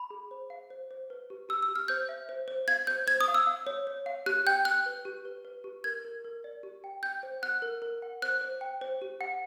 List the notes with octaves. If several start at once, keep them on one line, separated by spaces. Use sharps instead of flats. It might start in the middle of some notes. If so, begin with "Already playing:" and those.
Already playing: B5
G#4
C5
F5
C5
C5
B4
G4
G4 E6
E6
G4
F6
C5 G6
E5
C5
C5
F5 G#6
C5 G6
C5 G#6
D#6
F5
E6
F5
C#5
C#5
F5
G4 F#6
G5 G6
G5 F#6
B4
G4
B4
B4
G4
A#4 G#6
A#4
A#4
D5
G4
G5
G5 G6
C5
F#5 F#6
A#4
A#4
F#5
C5 F#6
C5
G5
C5
G4
F#5